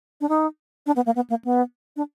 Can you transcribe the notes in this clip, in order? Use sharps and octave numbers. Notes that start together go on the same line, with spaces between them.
D4
D#4
D4
B3
A#3
B3
A#3
B3
D4